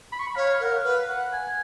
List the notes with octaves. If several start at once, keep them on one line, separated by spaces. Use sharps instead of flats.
B5
C#6
B5
C#5 F5
A#4 F#5
F5
B4
F#5
G#5